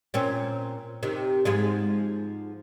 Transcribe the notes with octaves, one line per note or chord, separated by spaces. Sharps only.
A#2 C4 C#4
C3 D#3
G#2 F3 G#3